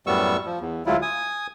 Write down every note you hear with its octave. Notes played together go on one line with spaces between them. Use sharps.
F#2 A2 G3 B3 C#6 E6
F3
E2
D2 F#3 G#3 E4 F4
G#5 D#6